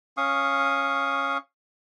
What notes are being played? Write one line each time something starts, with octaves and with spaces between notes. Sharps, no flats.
C#4 F5 C#6 D#6